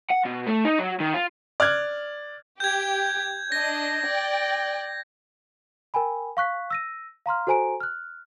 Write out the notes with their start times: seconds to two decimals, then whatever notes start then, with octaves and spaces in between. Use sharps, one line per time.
0.10 F#5
0.25 B2
0.46 A3
0.65 D#4
0.79 F#3
1.00 D#3
1.14 F4
1.60 D5 F6 F#6 G#6
2.60 G4 G6 G#6
3.52 D4 D#5 A#6
4.07 D5 G5
5.94 A#4 G5 G#5 B5
6.37 F5 C#6 F#6 B6
6.70 E6 A#6 D#7
7.26 F5 A#5 C6 F6
7.47 F#4 A4 C5 G#5 A#5 D7
7.80 F6 F#6